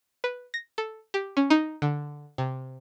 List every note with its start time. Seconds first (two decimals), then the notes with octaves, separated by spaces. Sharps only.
0.24 B4
0.54 A#6
0.78 A4
1.14 G4
1.37 C#4
1.50 D#4
1.82 D3
2.38 C3